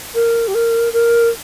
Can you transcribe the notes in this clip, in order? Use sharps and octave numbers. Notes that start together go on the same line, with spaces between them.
A#4
G4
A#4
A#4